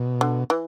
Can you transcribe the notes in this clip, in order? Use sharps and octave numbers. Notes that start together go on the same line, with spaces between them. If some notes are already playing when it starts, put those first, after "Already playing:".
Already playing: B2
D3
E3